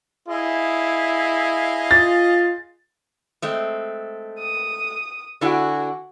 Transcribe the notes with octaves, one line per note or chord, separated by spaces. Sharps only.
E4 G#4 D#5 F5
F4 A6
G#3 A3 C4
D#6
D3 E4 F#4 G#5